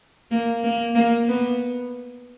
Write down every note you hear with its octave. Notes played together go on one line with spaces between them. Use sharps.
A#3
A#3
A#3
B3